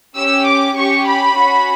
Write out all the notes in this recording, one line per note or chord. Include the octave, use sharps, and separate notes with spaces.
C#4 G4 E6
D6
C#4 G4 C#6
B5
C#4 F#4